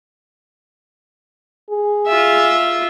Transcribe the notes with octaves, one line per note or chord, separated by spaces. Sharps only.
G#4
F4 E5